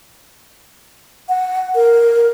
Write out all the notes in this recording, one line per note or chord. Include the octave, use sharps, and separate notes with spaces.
F#5
A#4